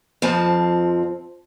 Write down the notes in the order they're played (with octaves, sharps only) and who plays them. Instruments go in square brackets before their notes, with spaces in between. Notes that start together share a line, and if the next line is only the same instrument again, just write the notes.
[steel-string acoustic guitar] F2 F3 C4 A5